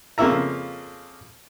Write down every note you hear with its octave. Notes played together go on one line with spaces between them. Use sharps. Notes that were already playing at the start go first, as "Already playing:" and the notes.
F2 C#3 A#3 F4 E5 A#5